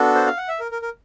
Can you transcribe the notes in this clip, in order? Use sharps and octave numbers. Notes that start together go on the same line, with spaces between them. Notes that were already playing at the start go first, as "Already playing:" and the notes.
Already playing: B3 D4 F#4 A4
C5
F5
F#5
E5
A#4
A#4
A#4